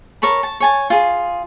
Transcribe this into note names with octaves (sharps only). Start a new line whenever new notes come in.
A#4 C#5 A5 B5
A5
C#5 G#5 A5
F4 G#4